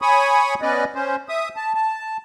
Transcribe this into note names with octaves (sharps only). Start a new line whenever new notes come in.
C#5 G#5 B5 C#6 D#6
B3 C#4 B4 D5 D#5
C#4 C5
E5 D#6
A5
A5